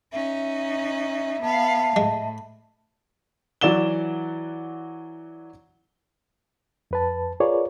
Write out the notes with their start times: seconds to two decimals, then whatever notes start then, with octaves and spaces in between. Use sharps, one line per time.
0.12 C#4 D#4 E5
1.42 B3 F5 A5
1.96 A2 G#3
3.61 E3 F#3 D5 F#5 E7 G7
6.91 F2 B4 A5
7.40 F4 G#4 A#4 B4 C#5 D5